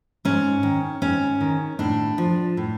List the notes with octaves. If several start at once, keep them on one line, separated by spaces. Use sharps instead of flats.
G#2 C#4
D#3
G#2 C#4
D#3
A2 D4
F3
A2